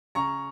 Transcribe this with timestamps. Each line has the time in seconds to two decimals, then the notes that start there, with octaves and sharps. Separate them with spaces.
0.15 C#3 A#5 C#6